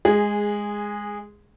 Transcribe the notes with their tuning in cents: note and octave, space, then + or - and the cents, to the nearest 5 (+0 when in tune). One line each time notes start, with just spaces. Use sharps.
G#3 +0 G#4 -15